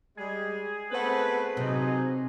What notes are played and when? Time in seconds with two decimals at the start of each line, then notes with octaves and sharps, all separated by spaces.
0.17 G3 G#3 G#4
0.91 A3 B3 C4 B4 C5 F#5
1.57 C3 F#3 D#4